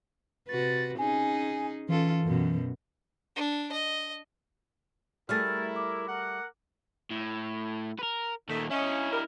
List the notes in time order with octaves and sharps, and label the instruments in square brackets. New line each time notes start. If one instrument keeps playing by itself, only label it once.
[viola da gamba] C3 F#4 B4 [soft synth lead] A6
[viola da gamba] C#4 D#4 G#4 [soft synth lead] G#5
[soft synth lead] E3 [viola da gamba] C#4 F4 A4
[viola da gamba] F#2 B2
[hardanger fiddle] D4
D#5
[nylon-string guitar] G3 A3 G#4 [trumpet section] E4 A#4 [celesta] F6 A6
[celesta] D6
[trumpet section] A#4 F#5
[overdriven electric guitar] A2
A#4 B4
[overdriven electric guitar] D#2 A#2 [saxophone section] A3 D#4
[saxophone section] C#4 [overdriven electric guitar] E4 D#5
[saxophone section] G3 A#4